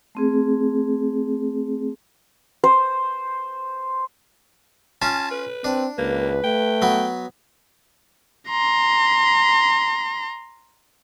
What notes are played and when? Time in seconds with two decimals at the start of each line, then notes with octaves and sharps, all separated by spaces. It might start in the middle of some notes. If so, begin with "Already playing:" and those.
0.15 A3 C4 G#4
2.64 C5
5.02 C#4 F4 A5
5.31 B4
5.64 C4 D4
5.98 C#2 A#3 B4
6.44 A3 G5
6.82 F#3 B3
8.49 A#5 C6